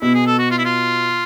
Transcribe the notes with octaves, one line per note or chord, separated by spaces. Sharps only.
B2 E4
G#4
A4
F#4
F4
E4
F4